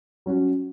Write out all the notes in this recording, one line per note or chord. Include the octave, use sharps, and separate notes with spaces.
F#3 C#4 F#4